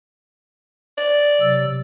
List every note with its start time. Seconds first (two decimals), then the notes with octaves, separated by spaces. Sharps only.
0.98 D5
1.41 C3 F#3 E6